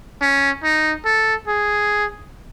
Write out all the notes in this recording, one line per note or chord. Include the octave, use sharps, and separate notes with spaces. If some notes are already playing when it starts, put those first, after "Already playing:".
C#4
D#4
A4
G#4